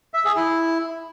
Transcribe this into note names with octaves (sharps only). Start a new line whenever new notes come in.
E5
G#4
E4